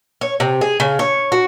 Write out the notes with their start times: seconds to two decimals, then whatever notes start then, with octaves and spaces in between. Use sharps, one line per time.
0.21 C#5
0.40 C3
0.61 G#4
0.80 C#3
0.99 C#5
1.32 F#4